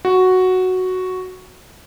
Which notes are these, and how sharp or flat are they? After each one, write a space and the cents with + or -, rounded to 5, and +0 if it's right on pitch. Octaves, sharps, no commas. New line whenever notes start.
F#4 +0